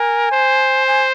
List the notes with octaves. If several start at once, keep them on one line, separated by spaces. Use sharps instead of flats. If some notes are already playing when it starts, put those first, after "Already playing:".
Already playing: A#4 G#5
C5
G#5